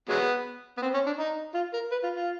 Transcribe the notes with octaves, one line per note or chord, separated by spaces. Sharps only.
F#3 G#3 B3
B3
C4
C#4
D4
D#4
F4
A#4
B4
F4
F4